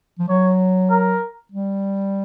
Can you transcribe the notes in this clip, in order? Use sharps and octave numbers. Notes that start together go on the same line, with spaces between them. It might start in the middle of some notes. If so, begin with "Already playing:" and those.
F3
F#3 C#5
A#4
G3